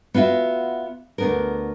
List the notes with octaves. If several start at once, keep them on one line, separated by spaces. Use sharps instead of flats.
B3 F4 F#4 E5
D2 B3 A#4